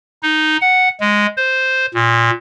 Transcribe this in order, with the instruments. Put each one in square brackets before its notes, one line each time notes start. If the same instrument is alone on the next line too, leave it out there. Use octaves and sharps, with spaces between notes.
[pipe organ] D#4
F#5
G#3
C5
A#2